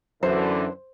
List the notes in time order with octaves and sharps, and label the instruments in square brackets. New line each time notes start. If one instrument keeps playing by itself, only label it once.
[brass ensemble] F#2 D3 E3 [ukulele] C5